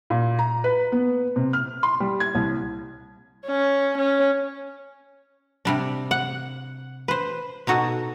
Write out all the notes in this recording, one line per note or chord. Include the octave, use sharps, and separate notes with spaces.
A#2
A#5
B4
B3
C3
F6
C6
G3
G#6
C2
C#4
C#4
C3 G3 D4
F#5
B4 C5
B2 D#4 F#4 A4